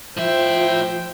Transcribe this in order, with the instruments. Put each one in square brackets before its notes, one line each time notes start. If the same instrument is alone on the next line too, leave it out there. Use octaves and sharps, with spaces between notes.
[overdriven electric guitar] A2 E5 [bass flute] F3 [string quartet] C5 G5